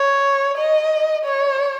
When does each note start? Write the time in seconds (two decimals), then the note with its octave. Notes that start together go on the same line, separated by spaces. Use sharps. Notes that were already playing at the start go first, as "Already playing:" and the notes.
Already playing: C#5
0.57 D#5
1.25 C#5